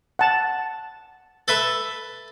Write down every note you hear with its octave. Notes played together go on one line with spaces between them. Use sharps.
F#5 A5
A4 B4 E5